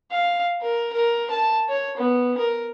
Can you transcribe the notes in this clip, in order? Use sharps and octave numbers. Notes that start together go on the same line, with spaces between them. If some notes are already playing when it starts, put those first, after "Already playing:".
F5
A#4
A#4
A5
C#5
B3
A#4